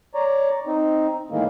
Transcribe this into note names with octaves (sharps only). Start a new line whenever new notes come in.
C#5 D5 A#5
C4 D#4
A2 D#3 E3 G#3 A#3